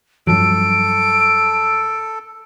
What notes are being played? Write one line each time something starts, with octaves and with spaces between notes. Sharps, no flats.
G2 F3 F#3 A4 D7